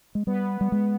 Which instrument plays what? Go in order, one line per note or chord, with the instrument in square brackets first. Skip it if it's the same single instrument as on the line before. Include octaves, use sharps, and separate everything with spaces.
[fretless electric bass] G#3
[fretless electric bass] G3 [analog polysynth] B3
[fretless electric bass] G3
[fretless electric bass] G#3 [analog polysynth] B3